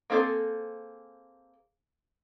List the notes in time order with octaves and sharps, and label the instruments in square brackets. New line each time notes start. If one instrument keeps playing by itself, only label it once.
[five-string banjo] A#3 C4 G#4 A4 C5